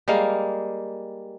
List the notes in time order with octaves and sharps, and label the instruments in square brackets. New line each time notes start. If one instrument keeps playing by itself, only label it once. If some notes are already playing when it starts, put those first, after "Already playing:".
[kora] G3 G#3 A#3 F5